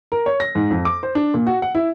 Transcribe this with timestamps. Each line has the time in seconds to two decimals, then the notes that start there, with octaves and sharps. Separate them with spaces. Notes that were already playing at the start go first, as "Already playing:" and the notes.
0.12 A#4
0.26 C#5
0.40 A#6
0.55 G#2
0.70 F2
0.85 D6
1.03 C5
1.15 D4
1.34 A#2
1.47 F#4
1.62 F#5
1.75 E4